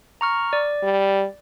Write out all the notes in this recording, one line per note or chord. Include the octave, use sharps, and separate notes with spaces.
A#5 C#6 F6
D5
G3